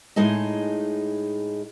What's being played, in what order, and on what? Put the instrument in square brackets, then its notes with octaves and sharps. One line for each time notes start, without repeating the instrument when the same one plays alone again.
[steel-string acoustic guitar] A2 G#3 D#4 G#4 D#5